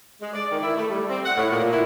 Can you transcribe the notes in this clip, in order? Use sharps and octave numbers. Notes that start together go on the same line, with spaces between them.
G#3
D5
D#3
E4
A3
G3
C4
F#5
A2
A#2
E4